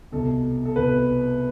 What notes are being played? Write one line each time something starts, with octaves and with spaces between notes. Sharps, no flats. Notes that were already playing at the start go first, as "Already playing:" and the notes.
C2 B2 A4
A4
C2 B2 B4